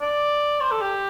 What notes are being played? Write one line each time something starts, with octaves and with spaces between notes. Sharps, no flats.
D5
C5
A4
G4